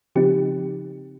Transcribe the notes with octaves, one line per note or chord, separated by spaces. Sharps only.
C#3 F3 C4 D#4 G4